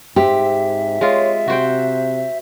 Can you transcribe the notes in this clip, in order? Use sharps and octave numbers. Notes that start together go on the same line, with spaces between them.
G#2 C4 G4 E5
G#3 F4 C#5
C3 F#4 C5 G5